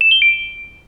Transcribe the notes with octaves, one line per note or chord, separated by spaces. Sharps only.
E7
G7
D7